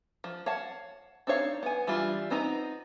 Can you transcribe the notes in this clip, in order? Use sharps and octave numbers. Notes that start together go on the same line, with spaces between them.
F3
C#5 F5 F#5 A5
C4 D4 D#4 C#5 F5
B3 G#5
E3 G3 D4 F4
B3 C4 D#4 A#5